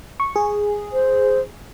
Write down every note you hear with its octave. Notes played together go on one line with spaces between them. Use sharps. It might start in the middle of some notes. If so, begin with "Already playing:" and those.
C#6
G#4
C5